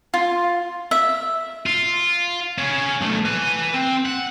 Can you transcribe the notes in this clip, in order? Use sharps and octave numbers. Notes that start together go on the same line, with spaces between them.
F4
E5
F4
C#4 G#4
B1 A3
B4 G#5
C4
F#5